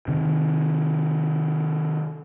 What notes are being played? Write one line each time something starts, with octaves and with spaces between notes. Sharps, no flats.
C3 D#3